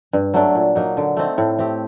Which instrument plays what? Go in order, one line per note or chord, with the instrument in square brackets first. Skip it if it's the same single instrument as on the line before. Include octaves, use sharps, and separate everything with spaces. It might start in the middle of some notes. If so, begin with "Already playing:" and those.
[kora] G2
F#3 A3 D4
A#2
F#3 A#3 D#4
D3
A3 C4 D#4
A2
A3 C4 G4